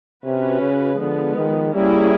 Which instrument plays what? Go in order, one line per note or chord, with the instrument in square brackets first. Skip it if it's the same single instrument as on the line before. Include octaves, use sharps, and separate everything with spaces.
[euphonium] C3 [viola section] C#4 F#4 B4
[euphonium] C#3
[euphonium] D3 [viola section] F3 G#3 B3
[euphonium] D#3
[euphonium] G3 [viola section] A#3 C#4 E4 G#4